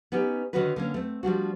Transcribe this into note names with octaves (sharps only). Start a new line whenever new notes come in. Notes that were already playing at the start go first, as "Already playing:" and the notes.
B3 C#4 D#4 G4
D3 D#3 C#4 D#4 F#4 B4
D3 A#3 C#4
A3 C4
F3 G3 D4 F#4